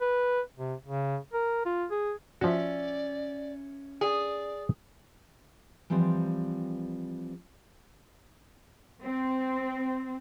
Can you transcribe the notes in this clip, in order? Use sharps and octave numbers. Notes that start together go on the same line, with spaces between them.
B4
C3
C#3
A#4
F4
G#4
F3 C#4 F#4 D5 E5
G#4 D5
E3 F3 G3 C4
C4